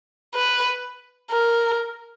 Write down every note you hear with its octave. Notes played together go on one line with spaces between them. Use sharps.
B4
A#4